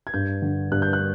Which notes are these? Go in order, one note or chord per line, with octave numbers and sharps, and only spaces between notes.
G#6
G2 G6
D3
G2 F#6
G6
F#6